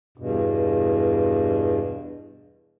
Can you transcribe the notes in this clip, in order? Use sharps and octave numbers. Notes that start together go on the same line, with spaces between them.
E2 G2 B2